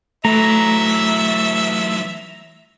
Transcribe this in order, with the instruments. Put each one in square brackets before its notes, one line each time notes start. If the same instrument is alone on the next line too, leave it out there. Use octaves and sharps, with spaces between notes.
[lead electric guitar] E3 F#3 [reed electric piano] A3 [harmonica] E5 [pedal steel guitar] A#5